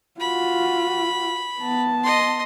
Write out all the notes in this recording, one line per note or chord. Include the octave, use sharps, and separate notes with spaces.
F4 F#4 B5
B3 A5
D#5 C6